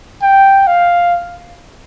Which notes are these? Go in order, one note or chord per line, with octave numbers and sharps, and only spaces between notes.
G5
F5